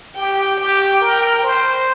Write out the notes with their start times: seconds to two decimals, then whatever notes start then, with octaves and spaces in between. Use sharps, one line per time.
0.16 G4 G5
0.59 G4 G5
1.01 A#4
1.43 C5